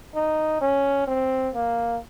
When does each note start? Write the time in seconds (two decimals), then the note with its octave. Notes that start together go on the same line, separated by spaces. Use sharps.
0.15 D#4
0.61 C#4
1.07 C4
1.55 A#3